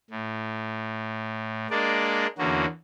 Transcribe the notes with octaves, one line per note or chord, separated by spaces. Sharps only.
A2
G#3 A#3 D4 D5
E2 D3 A#3 C#4 F#4